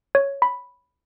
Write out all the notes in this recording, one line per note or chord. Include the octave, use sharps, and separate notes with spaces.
C#5
B5